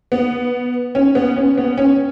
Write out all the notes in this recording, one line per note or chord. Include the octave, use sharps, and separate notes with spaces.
B3
C#4
B3
C#4
B3
C#4